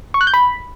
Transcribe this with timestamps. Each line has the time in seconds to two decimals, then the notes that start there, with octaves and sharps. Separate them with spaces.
0.14 C#6
0.21 F#6
0.27 G6
0.34 B5